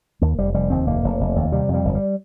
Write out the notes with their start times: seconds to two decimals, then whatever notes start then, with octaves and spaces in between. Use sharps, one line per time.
0.21 D#2 A#3
0.38 F1 G3
0.54 F1 G3
0.70 D#2 C4
0.87 F1 A#3
1.03 F1
1.20 F1
1.36 D#2
1.52 C3 G3
1.69 F2
1.74 G3
1.85 G1
1.95 G3